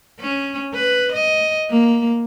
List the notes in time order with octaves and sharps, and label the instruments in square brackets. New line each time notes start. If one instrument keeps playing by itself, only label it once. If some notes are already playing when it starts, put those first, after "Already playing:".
[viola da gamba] C#4
B4
D#5
A#3